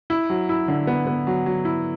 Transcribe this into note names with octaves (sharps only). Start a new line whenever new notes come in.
E4
F#3
E4
D3
B3
B3
F#3
F#3
E4